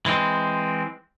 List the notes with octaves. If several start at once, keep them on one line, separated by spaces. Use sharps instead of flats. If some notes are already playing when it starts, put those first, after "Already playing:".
E3 G#3 C4